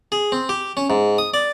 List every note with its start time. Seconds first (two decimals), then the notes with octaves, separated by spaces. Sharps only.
0.12 G#4
0.32 C4
0.49 G4
0.77 C#4
0.90 G#2
1.18 D#6
1.34 D5